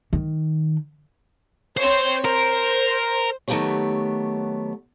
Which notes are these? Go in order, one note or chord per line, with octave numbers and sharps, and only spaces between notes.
D#3
C4 C5 C#5
A#4 C5
D#3 F#3 A3 B3 G4 C#5